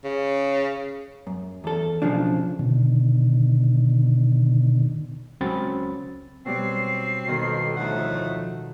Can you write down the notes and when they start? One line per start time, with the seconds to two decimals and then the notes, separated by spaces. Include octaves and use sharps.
0.04 C#3
1.27 F#2
1.64 E2 A4
2.02 B1 C#3 F3 D4
2.59 B2 D3 D#3
5.41 C#2 F#3 C4 C#4 B5 A6
6.46 B2 F#3 G3 C4 C7
7.27 B1 F2 B2 D#3
7.77 D2 A2 F3 A3 D#4 F#5